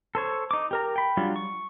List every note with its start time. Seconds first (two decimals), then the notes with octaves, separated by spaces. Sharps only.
0.15 A4 C5 C#5
0.51 D#4 D6
0.71 G4 A#4 A#5
0.96 G5 B5
1.17 F#3 G3 D4 F4
1.36 C#6